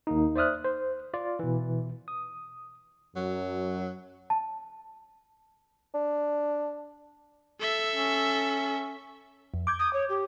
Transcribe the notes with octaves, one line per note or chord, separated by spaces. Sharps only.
D#2 A#3 D#4
C5 D5 E5 D#6 F6 F#6
C5
F4 D5
B2 E3
D#6
F#2 F#3
A5
D4
A4 E5
C#4
F2
D6 G6 G#6
D#6
C#5
G4